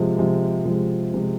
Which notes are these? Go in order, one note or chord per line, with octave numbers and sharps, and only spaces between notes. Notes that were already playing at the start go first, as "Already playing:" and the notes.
Already playing: C3 F3 G#3
C3 F3 G#3
C3 F3 G#3
C3 F3 G#3